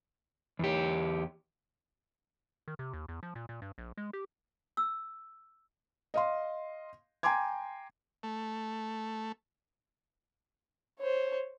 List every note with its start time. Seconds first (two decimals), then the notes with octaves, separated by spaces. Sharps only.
0.59 E2 G4
2.68 D#3
2.79 C3
2.93 D#2
3.08 E2
3.23 F3
3.35 A#2
3.49 A#2
3.62 G2
3.78 A#1
3.97 G#3
4.13 G4
4.77 E6
6.14 D#5 F5 C6
7.23 G5 G#5 A#5 C6 D6 G#6
8.23 A3
10.99 C5 C#5